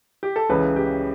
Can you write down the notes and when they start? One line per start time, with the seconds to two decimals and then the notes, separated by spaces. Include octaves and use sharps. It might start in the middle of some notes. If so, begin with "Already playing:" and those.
0.23 G4
0.36 A4
0.50 C#2 C#3 E3 B4
0.76 G4